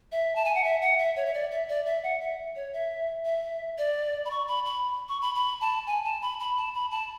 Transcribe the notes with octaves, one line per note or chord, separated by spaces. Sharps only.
E5
A5
G#5
F#5
E5
F#5
E5
C#5
E5
D5
E5
D5
E5
F#5
E5
C#5
E5
E5
D5
B5
C#6
B5
B5
C#6
B5
B5
A5
G#5
A5
B5
B5
A5
B5
A5